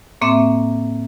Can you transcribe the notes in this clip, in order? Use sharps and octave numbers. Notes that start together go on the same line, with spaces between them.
A2 A#3 C4 E5 D6